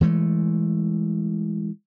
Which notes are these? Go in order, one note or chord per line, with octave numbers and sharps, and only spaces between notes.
E3 G#3 A3